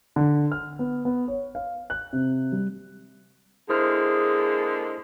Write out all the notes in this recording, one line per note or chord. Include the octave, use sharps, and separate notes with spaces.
D3
F6
B3
B3
C#5
F5
F#6
C3
G3
D3 G#3 A#3 E4 G#4 C5 F6